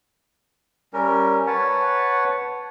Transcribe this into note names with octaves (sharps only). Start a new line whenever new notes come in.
G3 C#4 A#4
B4 C#5 F#5 A5